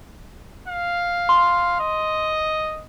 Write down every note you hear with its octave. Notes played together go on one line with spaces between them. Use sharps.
F5
C6
D#5